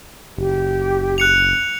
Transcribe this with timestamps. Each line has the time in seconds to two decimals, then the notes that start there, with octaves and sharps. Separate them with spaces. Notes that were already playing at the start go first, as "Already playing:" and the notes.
0.38 F#1 G4
1.18 F#6 C#7 F7